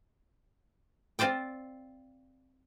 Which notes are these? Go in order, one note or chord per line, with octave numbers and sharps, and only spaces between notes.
C4 F4 C5 D5 G5